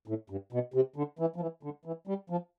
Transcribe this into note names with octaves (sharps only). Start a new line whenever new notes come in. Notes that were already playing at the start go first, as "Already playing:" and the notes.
A2
G2
B2
C3
D3
E3
F3
E3
D3
E3
G3
F3